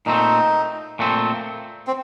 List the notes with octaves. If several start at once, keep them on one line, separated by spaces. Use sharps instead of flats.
A#2 A3 C4 D#4
A#2 A3 C4
C4